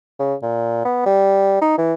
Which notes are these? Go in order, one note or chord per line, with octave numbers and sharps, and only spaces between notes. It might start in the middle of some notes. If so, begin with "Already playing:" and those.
C#3
A#2
B3
G3
D#4
E3